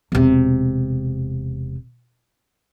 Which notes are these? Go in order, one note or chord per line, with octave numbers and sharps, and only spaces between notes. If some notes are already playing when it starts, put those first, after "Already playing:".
E1 C3